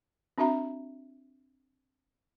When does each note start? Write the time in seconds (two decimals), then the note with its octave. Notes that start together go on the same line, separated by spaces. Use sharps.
0.38 C4 D4 F#4 E5 A#5